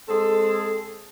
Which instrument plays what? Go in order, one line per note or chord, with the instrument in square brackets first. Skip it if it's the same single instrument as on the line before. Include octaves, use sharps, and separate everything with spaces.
[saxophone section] G#3 C4 G#4 A4